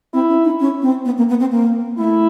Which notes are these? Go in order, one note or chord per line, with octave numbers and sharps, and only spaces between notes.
C4 E4
C#4
D#4
C#4
C4
B3
A#3
B3
C4
A#3
A3 E4